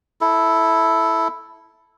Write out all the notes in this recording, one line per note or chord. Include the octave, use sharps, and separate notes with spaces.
E4 A4